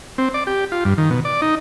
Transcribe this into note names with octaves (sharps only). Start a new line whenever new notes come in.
C4
D5
G4
F4
G2
D#3
B2
D5
D#4